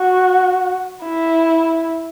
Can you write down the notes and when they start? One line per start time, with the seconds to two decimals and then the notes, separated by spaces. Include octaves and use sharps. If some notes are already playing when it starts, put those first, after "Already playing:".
Already playing: F#4
1.05 E4